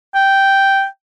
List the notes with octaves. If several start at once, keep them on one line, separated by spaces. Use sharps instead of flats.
G5